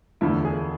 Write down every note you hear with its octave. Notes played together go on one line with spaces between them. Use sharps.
E1 D2 D3 F3 E4
G#4